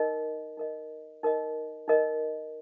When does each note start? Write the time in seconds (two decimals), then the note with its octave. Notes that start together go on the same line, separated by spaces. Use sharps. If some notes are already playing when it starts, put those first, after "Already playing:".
Already playing: D#4 A#4 D#5
0.57 D#4 A#4 D#5
1.23 D#4 A#4 D#5
1.88 D#4 A#4 D#5